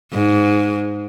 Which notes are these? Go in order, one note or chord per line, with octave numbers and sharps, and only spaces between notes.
G#2